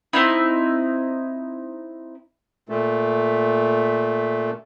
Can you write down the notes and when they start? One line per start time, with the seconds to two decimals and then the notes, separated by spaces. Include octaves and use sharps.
0.13 C4 D#4 E4
2.69 A#2 A3